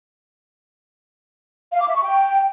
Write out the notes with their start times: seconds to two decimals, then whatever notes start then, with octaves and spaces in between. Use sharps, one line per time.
1.72 F5
1.80 D6
1.87 E5
1.95 C#6
2.03 G5